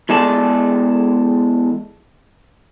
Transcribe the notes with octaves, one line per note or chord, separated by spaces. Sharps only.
E2 G#3 A4 D5 A5